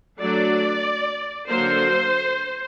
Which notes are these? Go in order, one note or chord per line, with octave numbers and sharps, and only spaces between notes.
F#3 A3 D4 D5
D3 F#3 A#3 C5